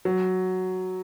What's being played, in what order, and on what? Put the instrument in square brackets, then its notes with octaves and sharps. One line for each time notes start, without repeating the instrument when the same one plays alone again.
[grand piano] F#3